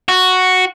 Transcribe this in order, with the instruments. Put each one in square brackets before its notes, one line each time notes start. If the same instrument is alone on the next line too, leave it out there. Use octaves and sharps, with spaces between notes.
[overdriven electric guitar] F#4